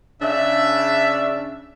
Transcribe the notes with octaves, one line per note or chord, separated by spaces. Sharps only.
C#3 D4 E5